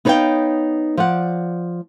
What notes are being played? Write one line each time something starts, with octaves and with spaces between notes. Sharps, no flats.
B3 D#4 B4 C#5 F5 G5
F3 D5 F#5